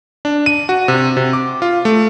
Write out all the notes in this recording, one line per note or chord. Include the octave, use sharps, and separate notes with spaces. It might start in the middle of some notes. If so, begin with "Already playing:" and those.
D4
D#7
F#4
C3
C3
D6
F4
A3